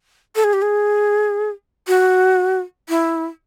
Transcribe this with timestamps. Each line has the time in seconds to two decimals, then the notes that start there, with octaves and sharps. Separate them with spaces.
0.36 A4
0.44 G#4
0.53 G4
0.62 G#4
1.88 F#4
2.89 E4